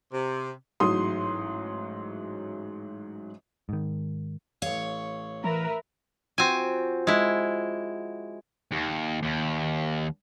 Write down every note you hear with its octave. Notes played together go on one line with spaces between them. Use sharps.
C3
A1 G#2 F#3 C6 D#6
G#2 D#3
A1 C#5 F5
E3 A#4 B4 E5
F3 C4 F#4 F5 G#5
G#3 E4
D#2
D#2